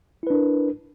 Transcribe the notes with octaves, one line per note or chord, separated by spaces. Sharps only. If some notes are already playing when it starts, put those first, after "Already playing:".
D4 E4 A#4 B4